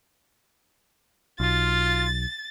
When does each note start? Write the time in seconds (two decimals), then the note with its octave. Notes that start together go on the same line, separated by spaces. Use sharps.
1.40 B1 F4 A6